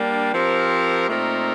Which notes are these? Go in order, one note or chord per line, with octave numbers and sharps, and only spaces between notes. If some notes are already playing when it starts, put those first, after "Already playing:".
Already playing: G3 A#3 D4
F3 C4 G4 A#4
A#2 A3 C4 D#4 A#4